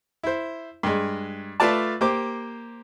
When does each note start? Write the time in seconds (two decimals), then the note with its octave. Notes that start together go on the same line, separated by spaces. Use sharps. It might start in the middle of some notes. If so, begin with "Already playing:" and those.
0.23 E4 C5
0.83 G2 G#3
1.60 A3 F4 B4 D5 A5
2.01 A#3 G4 C5 D6